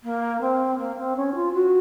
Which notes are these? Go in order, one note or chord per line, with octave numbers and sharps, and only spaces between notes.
A#3
C4
A#3
C4
C#4
F4
F#4